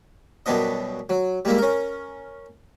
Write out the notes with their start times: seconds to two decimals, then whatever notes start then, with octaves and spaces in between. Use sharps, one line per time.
0.46 F#2 B2 G3 B3 D4 D#5
1.09 F#3
1.45 G3 G#3 A#3 E4
1.58 C#4 A#4